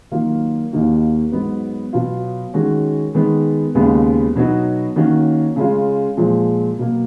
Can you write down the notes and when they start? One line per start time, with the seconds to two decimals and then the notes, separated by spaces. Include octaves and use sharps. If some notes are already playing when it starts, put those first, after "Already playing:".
0.11 D#3 F#3 A#3 F4
0.72 D#2 D#3 A#3 D#4 F#4
1.32 G#2 F#3 B3
1.93 B2 F#3 B3 F4
2.54 D#3 G#3 C#4 F#4
3.15 D#3 G#3 B3
3.75 D#2 C#3 G#3 B3
4.36 B2 F#3 B3 D#4 F#4
4.96 D#3 A#3 C#4 F#4
5.56 C#3 G#3 C#4 F4
6.17 A#2 F3 G#3
6.79 B2 F#3 A#3